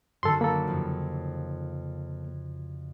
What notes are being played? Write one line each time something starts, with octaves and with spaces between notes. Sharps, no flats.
F#2 D3 D#3 A4 C6
A#3 A4 B5 D6
F2 C#3